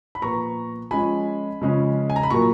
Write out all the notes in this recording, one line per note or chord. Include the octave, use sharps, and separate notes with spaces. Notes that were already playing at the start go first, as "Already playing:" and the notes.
B5
A#2 F3 B3 A#5 C#6
F3 G#3 C#4 G#5 B5
C#3 F3 G#3 C#4
G#5
A#5
B5
A#2 F#3 A#3 A#5 C#6